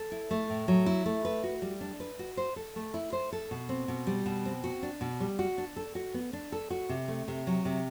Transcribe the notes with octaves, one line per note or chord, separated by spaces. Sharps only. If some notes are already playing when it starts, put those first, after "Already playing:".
Already playing: A4
E4
A3
A2
F#3
E4
A3
B4
F#4
G3
D4
B4
F#4
C5
A4
A3
E4
C5
A4
B2
C4
B2
G3
B2
C4
F#4
D4
B2
G3
F#4
D4
A4
F#4
B3
D4
A4
F#4
C3
A3
C3
F#3
C3